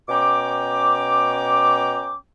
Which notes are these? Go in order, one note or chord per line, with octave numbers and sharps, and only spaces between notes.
B2 C#4 G5 A#5 D6